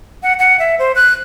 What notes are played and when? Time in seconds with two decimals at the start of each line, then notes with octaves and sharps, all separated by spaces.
0.23 F#5
0.39 F#5
0.59 E5
0.79 C5
0.95 F#6